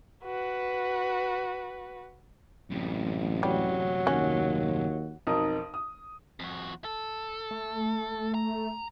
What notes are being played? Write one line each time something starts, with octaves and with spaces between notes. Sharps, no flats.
F#4 B4
A1 F#2 C3
F#3 G3
D#2 C#4 F#4
B1 F2 D#4 A#4 D#6
D#6
F2 F#4
A4
A3
A#5